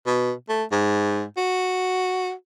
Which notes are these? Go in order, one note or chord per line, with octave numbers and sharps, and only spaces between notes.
B2
A3
G#2
F#4